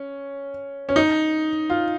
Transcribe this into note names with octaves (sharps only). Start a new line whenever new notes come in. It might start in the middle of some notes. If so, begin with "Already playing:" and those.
Already playing: C#4
C#4
D#4
F4